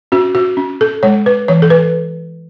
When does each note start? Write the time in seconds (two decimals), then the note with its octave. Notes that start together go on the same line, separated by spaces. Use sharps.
0.12 C#4 F#4
0.35 F#4
0.57 C#4
0.81 A4
1.03 G#3 C#5
1.26 B4
1.48 E3 C#5
1.62 A4
1.70 B4